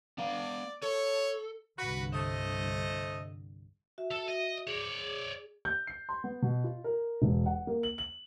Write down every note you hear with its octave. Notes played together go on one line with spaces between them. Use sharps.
B3 D5 F5
A4 C#5
C2 G2 D3 F#4 B4
A3 C5 D#5
F#4 E5
A4
D#5
G#4 C#5 D5
G6
C7
C6
B3
B2
F4
A#4
E1
F#5
A#3
F#7
F#7